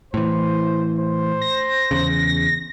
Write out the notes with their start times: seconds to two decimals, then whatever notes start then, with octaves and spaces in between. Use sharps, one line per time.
0.14 A2 E3 C5
0.99 C5
1.41 A#6
1.91 E2 C#3